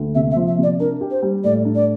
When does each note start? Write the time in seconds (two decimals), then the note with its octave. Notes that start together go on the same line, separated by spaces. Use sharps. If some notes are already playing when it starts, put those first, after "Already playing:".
Already playing: D2
0.15 C3 E5
0.31 E5
0.36 F3
0.47 E5
0.58 C3 D5
0.80 D4 A#4
1.01 G4
1.11 C5
1.22 G3
1.44 A2 D5
1.65 D4
1.75 D5